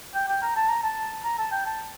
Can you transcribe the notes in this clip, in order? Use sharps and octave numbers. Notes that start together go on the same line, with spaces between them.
G5
G5
A#5
A5
A#5
A5
A#5
A5
G5
A5